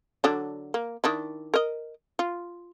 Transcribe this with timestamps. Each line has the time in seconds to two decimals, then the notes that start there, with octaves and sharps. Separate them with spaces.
0.24 D3 F#3 D4
0.74 A#3
1.04 D#3 D4 E4
1.54 A#4 D#5
2.19 F4